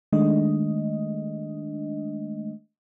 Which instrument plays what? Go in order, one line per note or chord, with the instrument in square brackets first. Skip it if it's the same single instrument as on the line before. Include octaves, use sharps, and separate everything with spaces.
[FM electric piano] D#3 G#3 A3 D4 D#5